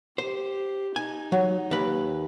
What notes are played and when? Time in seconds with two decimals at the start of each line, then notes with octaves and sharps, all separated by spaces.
0.18 G4 C5
0.96 D#4 G#5
1.32 F#3
1.71 D#2 B4